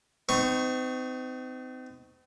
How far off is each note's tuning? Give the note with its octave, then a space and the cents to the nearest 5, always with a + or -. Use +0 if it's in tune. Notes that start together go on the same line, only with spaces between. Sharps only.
C4 -40 D#4 +0 C#6 +0